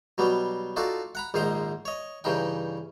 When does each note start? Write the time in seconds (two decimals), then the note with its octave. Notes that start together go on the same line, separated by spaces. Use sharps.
0.18 B2 F#3 G3 B3
0.76 D#4 F4 F#4 A4 D5
1.15 F#5 A#5 B5
1.34 A#1 G#2 D#3 C5 D#5 A#5
1.85 C#5 D#5
2.24 G2 C#3 E3 D#4 G5